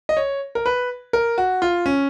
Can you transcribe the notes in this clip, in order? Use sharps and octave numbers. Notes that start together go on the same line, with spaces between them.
D#5
C#5
A#4
B4
A#4
F#4
F4
C#4